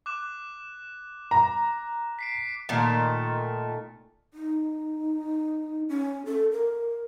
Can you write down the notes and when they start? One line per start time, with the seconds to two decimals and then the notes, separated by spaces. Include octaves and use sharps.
0.06 D6 F#6 E7
1.31 A#5
2.19 B6 C7 D7
2.69 A#2 D#3 A3
4.34 D#4
5.89 C#4
6.26 A4
6.52 A#4